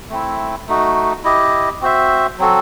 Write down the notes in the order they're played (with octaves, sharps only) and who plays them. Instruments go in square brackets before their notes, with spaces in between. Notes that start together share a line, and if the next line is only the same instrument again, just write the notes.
[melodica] A3 C4 E4
A3 D#4 F#4
E4 G4 D#5
C4 F#4 C5 E5
F#3 C4 F#4 A4